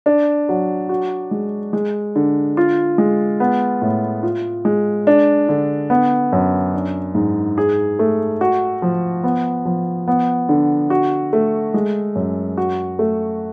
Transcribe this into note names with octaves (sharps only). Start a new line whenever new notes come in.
D4
F#3
F#4
G#3
G#3
D3
F4
G#3
B3
A2
F4
G#3
D4
D3
B3
F#2
D4
G#2
G#4
A3
F#4
F3
B3
F3
B3
D3
F#4
A3
G#3
F#2
F#4
A3